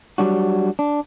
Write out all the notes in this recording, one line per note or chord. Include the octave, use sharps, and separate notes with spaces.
F#3 G3 D4 F#4
D4